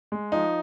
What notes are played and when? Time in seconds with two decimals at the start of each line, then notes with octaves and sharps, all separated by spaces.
0.12 G#3
0.32 F3 D#4